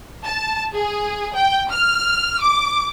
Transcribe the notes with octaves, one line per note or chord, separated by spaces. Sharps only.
A5
G#4
G5
F6
D6